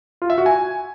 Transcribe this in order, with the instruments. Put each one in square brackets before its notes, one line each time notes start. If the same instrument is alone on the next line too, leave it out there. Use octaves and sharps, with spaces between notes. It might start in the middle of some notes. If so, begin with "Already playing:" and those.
[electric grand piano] F4
E5
F#4
G#5